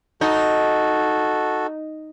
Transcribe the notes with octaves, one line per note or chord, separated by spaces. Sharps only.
D#4 F#4 A4